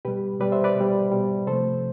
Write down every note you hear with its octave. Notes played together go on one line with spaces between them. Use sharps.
B2 G3 G4 B4
B2 G3 B4 D5
C5 E5
B4 D5
B2 G3
B2 G3
C3 F3 A3 A4 C5